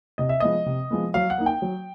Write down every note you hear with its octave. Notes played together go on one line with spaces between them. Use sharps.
C3 D#5
E5
F3 G#3 B3 D#5
C3
F3 G#3 B3
F#3 F5
F#5
A#3 D#4
G5
F#3